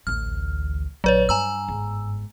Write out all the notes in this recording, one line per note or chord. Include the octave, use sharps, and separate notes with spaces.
A1 D2 F6
A#1 D3 F#3 B4 C#5
G2 G#5 A#5 E6
G1 G#2